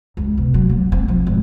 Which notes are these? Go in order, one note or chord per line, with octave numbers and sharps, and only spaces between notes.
C#2
B2
F#3
A#3
C4
F3
G#1